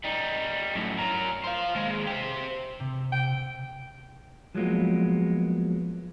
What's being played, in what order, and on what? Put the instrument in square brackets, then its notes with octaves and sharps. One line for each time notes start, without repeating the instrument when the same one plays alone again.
[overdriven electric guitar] G3 D#4
F#2 A2
F#3 A#4
C5 F5
D#2 G#3
G4 C5
[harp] C3
[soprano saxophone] G5
[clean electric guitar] F3 F#3 G#3 A#3 B3